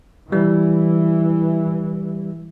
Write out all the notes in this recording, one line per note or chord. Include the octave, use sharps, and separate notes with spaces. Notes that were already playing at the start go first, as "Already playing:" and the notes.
E3 G3